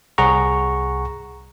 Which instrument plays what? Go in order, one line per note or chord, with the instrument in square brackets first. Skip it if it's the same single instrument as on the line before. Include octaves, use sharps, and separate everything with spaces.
[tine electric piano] C2 G#4 F#5 A#5 C#6